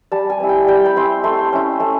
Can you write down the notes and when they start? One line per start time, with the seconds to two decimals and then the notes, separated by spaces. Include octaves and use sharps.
0.12 G3 A5
0.30 G#5
0.40 C4 E4
0.49 G5
0.67 G3 G5
0.86 B5
0.96 C4 E4 C6
1.24 A3 C6
1.53 C#4 E4
1.80 A3